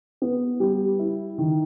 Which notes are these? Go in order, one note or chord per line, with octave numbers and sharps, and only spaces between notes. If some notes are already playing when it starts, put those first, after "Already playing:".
B3
G3
E4
D#3